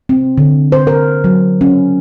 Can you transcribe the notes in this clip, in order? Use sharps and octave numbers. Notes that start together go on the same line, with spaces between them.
C4
D3
C5
A#4
F#3
C#4